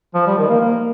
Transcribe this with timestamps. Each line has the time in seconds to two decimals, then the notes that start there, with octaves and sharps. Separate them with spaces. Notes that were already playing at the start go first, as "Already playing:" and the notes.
0.14 F3
0.27 G3
0.38 D#3
0.49 A#3
0.60 A#3